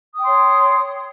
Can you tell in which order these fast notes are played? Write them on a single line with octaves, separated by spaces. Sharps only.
D#6 G5 C6 C#5